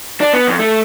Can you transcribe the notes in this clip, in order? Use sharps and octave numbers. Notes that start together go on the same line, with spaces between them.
D4
B3
F2
A3